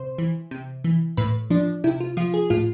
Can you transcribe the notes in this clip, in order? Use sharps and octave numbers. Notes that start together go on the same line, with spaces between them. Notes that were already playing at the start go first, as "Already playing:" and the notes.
Already playing: C3 C5
E3
C3
E3
A2 B4
F3 D4
C3 E4
F4
F3 F4
G#4
A2 F4